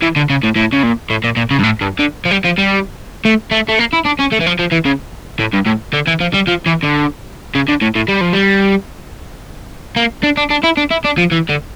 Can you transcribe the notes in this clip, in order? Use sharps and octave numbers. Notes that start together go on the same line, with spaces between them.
E3
D3
C#3
A2
A2
C#3
A#2
A2
A#2
A#2
C#3
G2
A2
G2
D3
F3
G3
F3
G3
A3
A3
A3
A#3
E4
D4
C#4
A3
E3
F3
F3
E3
C#3
A2
G2
A2
D3
E3
F3
G3
F3
E3
D3
C#3
D3
A2
A2
G3
F3
G3
A#3
D4
D4
D4
E4
D4
E4
D4
F3
E3
D3